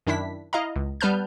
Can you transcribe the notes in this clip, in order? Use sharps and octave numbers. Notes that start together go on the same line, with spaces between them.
F#2 D#3 D4 E4 B6
E4 D#5 F5 A#5
C#2
G3 B3 B4 A5 F6 G6